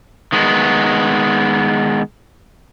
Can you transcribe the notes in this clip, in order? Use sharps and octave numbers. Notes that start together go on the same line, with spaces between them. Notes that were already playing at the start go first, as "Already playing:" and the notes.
D#3 G#3 B3